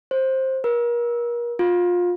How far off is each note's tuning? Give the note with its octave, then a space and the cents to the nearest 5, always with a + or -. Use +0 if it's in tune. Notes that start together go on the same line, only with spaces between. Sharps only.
C5 +15
A#4 +35
F4 +25